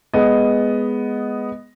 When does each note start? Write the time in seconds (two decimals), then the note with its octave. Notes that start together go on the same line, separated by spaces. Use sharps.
0.14 G#3 B3 D#5